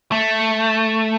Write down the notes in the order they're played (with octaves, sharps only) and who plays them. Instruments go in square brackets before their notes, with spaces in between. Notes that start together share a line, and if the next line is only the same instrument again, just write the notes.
[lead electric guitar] A3